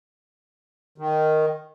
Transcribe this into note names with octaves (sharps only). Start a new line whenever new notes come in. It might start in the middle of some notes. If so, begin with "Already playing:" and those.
D#3